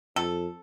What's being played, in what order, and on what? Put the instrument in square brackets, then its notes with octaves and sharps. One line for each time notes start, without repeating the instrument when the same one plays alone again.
[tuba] F2 [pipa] A4